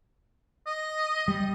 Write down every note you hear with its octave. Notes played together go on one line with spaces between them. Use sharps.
D#5
G3